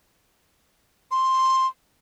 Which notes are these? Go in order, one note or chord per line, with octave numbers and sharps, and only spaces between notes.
C6